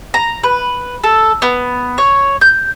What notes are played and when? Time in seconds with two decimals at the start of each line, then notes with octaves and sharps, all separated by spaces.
0.14 A#5
0.43 B4
1.04 A4
1.42 B3
1.98 C#5
2.41 G6